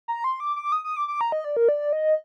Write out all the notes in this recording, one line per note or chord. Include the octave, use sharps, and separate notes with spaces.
A#5
C6
D6
D6
D#6
D#6
D6
D6
A#5
D#5
D5
A#4
D5
D#5